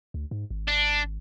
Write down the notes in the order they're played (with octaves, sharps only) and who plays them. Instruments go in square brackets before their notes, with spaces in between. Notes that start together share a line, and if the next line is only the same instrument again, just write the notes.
[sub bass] D2
G#2
G#1
[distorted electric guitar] D4